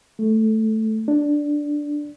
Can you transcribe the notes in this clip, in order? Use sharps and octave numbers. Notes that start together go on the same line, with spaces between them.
A3
D4